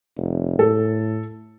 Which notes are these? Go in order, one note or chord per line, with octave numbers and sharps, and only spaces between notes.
F1
A2 A4